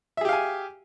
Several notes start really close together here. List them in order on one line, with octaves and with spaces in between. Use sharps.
E5 G#4 G4 F5 G#5